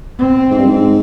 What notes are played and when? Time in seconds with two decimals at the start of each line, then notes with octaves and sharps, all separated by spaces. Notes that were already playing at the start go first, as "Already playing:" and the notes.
0.19 C4
0.51 G#2
0.58 G2
0.66 G#2